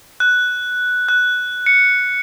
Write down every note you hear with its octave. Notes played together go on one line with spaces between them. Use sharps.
F#6
F#6
C#7